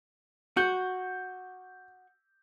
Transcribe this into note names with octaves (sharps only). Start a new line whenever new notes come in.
F#4 G6